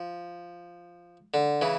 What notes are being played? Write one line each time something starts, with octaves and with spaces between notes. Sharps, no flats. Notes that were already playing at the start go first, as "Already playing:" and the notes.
Already playing: F3
D3
C#3 E3